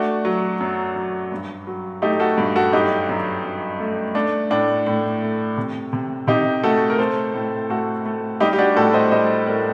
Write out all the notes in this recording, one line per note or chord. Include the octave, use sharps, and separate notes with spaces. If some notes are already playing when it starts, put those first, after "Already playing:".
Already playing: A3 D4 F#4
F#3
F#2
F#2
G2
F#3
A3 D#4 G4
F#4 A4
G2
F#4 A4
F#2 D#4 G4
F#2
F#2
A3
A3 D4
A2 D4
A2
A3
C3
C3
C3 D#4 G4
A3 F#4 A4
A#4
A3 A4 C5
A2
A3 F#4 A4
A3
G3 D#4 G4
G4
D4 F#4
A2 F#4 A4
C5 D#5
G3 C5 D#5
A2 A#4 D5